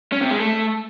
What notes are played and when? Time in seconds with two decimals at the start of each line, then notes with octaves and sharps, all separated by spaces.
0.12 C#4
0.21 C3
0.31 G#3
0.40 A3